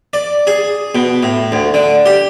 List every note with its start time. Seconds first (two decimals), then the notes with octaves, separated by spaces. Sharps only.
0.13 D5
0.47 G#4
0.95 B2
1.23 A2
1.52 D2
1.74 D3
2.06 G4